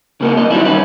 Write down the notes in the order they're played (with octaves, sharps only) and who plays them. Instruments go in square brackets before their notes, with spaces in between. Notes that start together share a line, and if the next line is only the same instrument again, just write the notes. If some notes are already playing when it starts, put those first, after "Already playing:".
[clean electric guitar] C#3 A#3 B3
B1 A#2 D#5
D#3 F#3 G3 C#4 E4
G3 C#4 B4